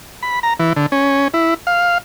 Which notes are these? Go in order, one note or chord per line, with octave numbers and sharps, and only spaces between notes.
B5
A#5
E3
D3
C#4
E4
F5